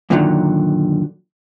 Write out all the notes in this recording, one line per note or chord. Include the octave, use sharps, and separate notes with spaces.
F#2 A#2 D3 D#3 F3 F#3